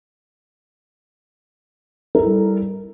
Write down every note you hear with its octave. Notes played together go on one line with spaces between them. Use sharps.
G3 E4 A4 A#4